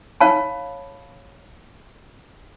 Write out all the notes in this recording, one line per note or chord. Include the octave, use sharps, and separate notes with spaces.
C#5 F5 A5 B5